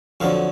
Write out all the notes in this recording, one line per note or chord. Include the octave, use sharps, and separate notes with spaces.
F2 D3 F#3 F5